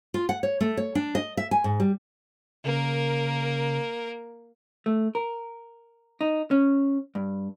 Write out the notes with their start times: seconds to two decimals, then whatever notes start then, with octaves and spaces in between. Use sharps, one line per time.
0.14 F4
0.29 F#5
0.43 C#5
0.61 A3
0.77 C#5
0.95 D4
1.15 D#5
1.37 E5
1.51 G#5
1.64 G#2
1.80 G3
2.64 C#3 A#3 A#4
4.86 A3
5.15 A#4
6.21 D#4
6.51 C#4
7.15 G2